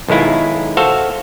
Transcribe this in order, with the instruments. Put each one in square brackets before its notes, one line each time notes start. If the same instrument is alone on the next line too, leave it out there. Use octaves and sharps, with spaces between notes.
[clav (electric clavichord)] B1 D#3 G#3 E4 F4
F#4 A4 C5 E5 F5